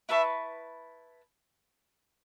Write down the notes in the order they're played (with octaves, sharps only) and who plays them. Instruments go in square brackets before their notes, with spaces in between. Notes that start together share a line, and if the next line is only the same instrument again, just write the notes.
[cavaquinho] E4 B4 A5 C#6 [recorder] E5